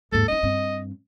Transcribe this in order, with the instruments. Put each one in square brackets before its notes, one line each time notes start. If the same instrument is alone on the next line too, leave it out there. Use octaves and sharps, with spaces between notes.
[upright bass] D#2 G#2 [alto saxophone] A4
[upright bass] C#4 D#4 [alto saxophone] D#5
[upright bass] G2 C4